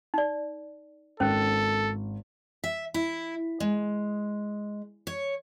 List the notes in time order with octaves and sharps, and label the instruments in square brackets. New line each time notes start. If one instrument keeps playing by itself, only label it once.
[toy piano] D#4 D5
[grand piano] G#1 [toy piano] C#4 C5 [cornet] A4
[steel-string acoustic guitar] E5
E4
G#3
C#5